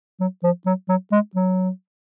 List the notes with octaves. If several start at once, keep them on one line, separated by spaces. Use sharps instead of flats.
F#3
F3
F#3
F#3
G#3
F#3